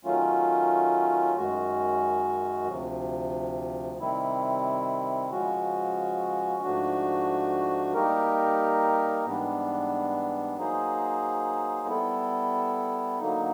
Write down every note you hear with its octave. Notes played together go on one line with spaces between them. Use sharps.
D#3 F#3 A3 C#4 F4
F#2 D#3 G#3 C#4 F#4
D2 C3 F3
C3 D#3 G3 C4 E4
C#3 F3 G#3 C#4 F#4
G#2 F3 A3 D4 F#4
G3 A#3 D#4 G4 A#4
G#2 E3 G3 B3 D4
F#3 A#3 D#4 G#4 C5
G3 B3 E4 A4
D3 F#3 A#3 D#4